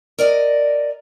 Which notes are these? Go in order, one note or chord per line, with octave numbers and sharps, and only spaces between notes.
A#4 D5 D#5